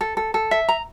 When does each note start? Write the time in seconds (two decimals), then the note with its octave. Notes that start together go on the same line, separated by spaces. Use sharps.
0.01 A4
0.17 A4
0.34 A4
0.51 E5
0.69 A#5